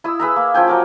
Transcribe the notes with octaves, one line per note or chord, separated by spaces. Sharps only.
E4 D#5 E6
G#4 B4 E5 A#5
A#3
F3 C#4 G5 G#5
F#3 A#4 D6